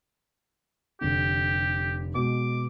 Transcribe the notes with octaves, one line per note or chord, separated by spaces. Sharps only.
F1 D3 G4
B2 G#3 D6